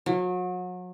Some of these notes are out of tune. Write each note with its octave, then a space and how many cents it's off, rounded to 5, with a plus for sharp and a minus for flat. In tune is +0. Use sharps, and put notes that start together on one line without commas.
F#3 -35